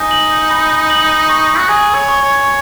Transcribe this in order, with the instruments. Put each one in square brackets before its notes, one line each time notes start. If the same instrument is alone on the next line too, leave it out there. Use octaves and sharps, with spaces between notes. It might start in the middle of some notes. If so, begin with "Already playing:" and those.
Already playing: [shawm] D#4 [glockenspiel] G#5
[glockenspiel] F#7
B5
F#7
C#6
[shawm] F#4
[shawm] G#4 [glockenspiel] G#5
[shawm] C#5
[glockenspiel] C#6
[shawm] C#5